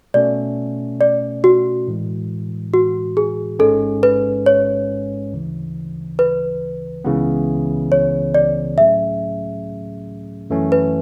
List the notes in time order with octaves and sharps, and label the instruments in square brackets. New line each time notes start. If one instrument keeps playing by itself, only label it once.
[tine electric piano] B2 A3 C#4 [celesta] D5
[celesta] D5
F#4
[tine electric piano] A2 E3 G#3
[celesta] F#4
G#4
[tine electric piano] A1 G#2 G#3 C#4 [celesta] A4
[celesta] B4
C#5
[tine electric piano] D2 C#3 E3
[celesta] B4
[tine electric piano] C#2 C#3 E3 B3
[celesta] C#5
D5
[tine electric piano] A2 F#3 A3 C#4 G#4 [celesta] E5
[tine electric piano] F#2 E3 A3 C#4
[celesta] B4